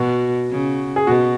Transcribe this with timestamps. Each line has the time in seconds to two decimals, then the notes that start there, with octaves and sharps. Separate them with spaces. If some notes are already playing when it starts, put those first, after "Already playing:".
Already playing: B2 F#4
0.50 C#3
0.96 G#4
1.07 B2 F#4